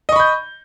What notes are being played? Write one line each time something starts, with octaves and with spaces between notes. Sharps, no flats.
D#5 B5 C#6 G6